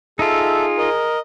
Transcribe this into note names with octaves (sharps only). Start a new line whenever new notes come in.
D#4 F4 G#4 A4 E5
A#4 D#5